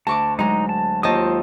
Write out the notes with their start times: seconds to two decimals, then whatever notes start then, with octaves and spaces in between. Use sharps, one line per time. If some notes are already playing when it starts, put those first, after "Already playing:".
0.07 D2 A5 C#6 D6
0.39 F#3 G#3 D#4 A#5
0.69 A5
1.03 D#2 F4 C5 D#5 A5 D#6